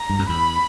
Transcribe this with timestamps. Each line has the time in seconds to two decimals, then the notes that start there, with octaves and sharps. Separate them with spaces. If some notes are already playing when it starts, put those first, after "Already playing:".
Already playing: A#5
0.10 G2
0.19 F#2
0.29 E2 B5